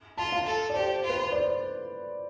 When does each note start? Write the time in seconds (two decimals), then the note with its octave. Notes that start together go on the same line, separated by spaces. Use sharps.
0.17 F4 A5
0.32 F5
0.46 A4
0.70 D5
0.75 G4 C5
1.04 F4
1.10 B4
1.20 C5
1.32 D5